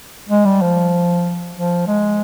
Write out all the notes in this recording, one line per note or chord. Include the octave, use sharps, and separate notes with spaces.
G#3
G3
F3
F3
G#3